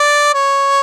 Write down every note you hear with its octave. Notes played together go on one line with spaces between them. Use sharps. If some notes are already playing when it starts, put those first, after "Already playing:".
Already playing: D5
C#5